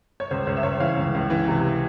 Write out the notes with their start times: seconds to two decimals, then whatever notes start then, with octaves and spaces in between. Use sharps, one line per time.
0.20 C#5
0.31 C#2 C5
0.47 C#2 C#5
0.57 E5
0.63 C#2 C#5
0.80 E3 F5
0.97 C#2
1.14 C#2
1.30 E3
1.48 C3